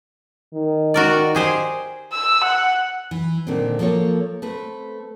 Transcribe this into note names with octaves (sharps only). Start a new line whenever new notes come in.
D#3
F#4 A#4 D5
G4 G#4 C5
E6
F#5
E3
A#2 D3 D#3 C4
F3 A#3 F4 A4 C#5
A3 C4 B4